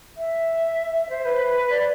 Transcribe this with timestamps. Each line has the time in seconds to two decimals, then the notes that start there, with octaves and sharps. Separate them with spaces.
0.17 E5
1.09 C5
1.25 B4
1.71 D5